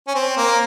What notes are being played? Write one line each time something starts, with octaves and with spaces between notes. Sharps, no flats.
C#4
C4
A#3